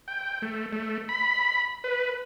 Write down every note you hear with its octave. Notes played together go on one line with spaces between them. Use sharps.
G5
A3
A3
B5
B4